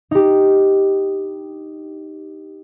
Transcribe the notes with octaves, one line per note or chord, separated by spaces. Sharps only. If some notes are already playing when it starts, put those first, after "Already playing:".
D#4 G4